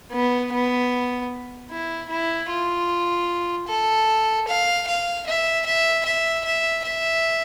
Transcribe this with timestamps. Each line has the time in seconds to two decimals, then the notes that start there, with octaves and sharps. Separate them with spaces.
0.12 B3
0.53 B3
1.70 E4
2.10 E4
2.49 F4
3.68 A4
4.48 F5
4.88 F5
5.27 E5
5.66 E5
6.05 E5
6.45 E5
6.85 E5